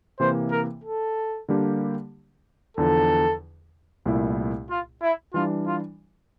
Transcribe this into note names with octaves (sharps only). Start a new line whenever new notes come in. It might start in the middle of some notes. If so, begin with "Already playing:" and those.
C3 E3 A#3 C5
A#4
A4
D3 G3 A#3 D4 G4
E2 D3 F3 A4
C2 A#2 A3 E4
F4
E4
E3 G3 D4 F4
F4